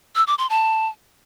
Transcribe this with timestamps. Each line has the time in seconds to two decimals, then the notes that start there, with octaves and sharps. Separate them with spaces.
0.16 E6
0.27 D6
0.38 C6
0.50 A5